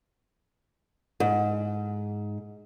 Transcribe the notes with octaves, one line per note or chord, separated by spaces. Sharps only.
G#2